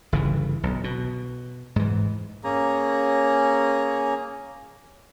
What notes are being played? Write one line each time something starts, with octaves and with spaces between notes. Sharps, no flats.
G1 C#3 E3
B1
B2
G#2 E3
A#3 C#4 G#4 A#5